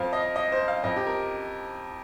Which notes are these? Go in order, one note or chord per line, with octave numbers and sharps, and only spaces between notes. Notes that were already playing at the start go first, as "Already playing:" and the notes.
Already playing: F2 F3 F5
D#5
D#5
C5
F5
F2 F3 D#5
G4
A#4